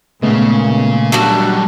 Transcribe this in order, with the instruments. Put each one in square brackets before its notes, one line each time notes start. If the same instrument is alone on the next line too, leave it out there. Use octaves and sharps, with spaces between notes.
[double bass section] A#2 [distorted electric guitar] C#3 [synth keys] G#3 A3 B3
[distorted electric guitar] F#3 G3 [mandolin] A3 D4 F#4